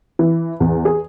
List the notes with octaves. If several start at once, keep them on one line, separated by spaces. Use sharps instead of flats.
E3
E2
G#4